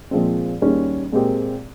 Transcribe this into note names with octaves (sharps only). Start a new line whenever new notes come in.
A#2 F3 G#3 C4
D#2 D#3 G3 C#4 G#4
A#2 G#3 C4 G4 A#4